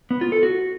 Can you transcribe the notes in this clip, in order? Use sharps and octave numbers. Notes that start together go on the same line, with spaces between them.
B3
F4
A4
F#4